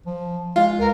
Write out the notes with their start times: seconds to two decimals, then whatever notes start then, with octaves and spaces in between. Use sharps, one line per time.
0.06 F3
0.56 G#3 F4
0.79 C#2 A#4